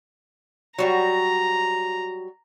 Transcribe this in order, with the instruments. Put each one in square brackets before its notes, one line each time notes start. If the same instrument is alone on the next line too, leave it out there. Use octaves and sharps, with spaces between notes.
[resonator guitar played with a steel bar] F#3 G3 F#4 [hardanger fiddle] A#5